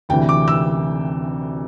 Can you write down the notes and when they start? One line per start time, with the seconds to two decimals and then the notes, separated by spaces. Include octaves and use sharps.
0.09 D2 C3 E3 G5
0.29 D6
0.48 E6